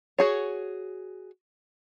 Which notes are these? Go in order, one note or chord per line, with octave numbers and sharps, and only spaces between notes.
F#4 G#4 C#5